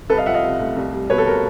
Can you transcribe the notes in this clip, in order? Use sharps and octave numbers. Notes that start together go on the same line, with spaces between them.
C2 A4 B4
D#5 F5
F3 E5 F#5
D#5 F5
C3
A3
C2
G3
B2 B4 C#5
A4
A#4